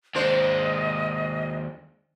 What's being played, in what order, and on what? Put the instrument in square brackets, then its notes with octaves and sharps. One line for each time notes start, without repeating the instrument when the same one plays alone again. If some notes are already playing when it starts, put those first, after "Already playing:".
[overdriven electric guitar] D#2 G#3 [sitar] D4 C5 [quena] D#5